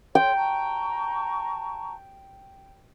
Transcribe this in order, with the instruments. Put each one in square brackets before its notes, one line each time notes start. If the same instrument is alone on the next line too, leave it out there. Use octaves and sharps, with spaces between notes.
[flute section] A4 C#5 C6 [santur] G5
[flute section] A5 A#5 C#6